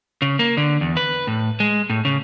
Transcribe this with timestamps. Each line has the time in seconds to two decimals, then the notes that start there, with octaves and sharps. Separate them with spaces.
0.22 C#3
0.39 A#3
0.57 D3
0.81 E2
0.97 B4
1.27 A2
1.60 G#3
1.90 A2
2.05 C#3